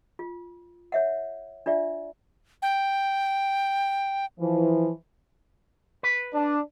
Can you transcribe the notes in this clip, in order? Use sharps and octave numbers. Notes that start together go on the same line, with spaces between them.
F4
C#5 E5 F#5
D4 F4 D5 E5
G5
E3 F3
B4
D4